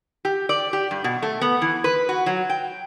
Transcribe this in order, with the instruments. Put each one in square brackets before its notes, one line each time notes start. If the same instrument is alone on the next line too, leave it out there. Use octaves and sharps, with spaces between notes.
[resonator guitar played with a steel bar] G4
D5
G4
G2
B2
A3
B3
E3
B4
F#4
F#3
G5